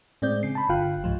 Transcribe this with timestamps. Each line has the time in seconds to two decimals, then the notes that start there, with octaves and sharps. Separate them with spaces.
0.22 A2 G#3 C4 D5 G6
0.43 C#3 C7
0.55 A5 B5
0.69 G1 D3 F4 F5 G5 F#6
1.04 C2 G#2 F3